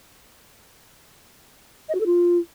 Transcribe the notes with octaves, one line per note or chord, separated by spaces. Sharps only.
D#5
F#4
A4
F4